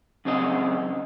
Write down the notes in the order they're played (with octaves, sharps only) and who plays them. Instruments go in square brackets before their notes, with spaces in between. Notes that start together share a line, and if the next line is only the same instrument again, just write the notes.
[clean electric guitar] F#2 C#3 C4 G#4 D#5